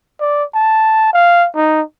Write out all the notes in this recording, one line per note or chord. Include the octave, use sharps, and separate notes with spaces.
D5
A5
F5
D#4